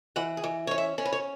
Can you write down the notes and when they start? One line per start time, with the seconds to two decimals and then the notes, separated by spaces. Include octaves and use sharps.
0.16 E3 F#5
0.37 G#4
0.44 E3
0.67 C#4 C#5
0.78 E5
0.98 C#4 C#5
1.05 B4
1.13 C#5